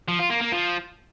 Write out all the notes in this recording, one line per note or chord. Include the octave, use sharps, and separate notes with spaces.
F3
F4
A#3
A#3
F3